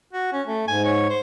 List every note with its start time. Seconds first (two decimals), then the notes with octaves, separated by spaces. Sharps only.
0.13 F#4
0.33 C#4
0.47 A3
0.68 G#2 G#5
0.85 C#5
1.10 C5